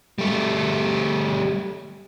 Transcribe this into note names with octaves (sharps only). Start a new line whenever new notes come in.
G3 A3